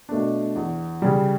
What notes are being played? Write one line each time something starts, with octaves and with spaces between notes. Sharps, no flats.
B2 A3 D4
E2
C#3 G3